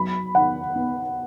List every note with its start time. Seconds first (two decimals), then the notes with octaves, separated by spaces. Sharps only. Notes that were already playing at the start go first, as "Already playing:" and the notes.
Already playing: F#3 B5
0.35 D#3 F#5
0.76 B3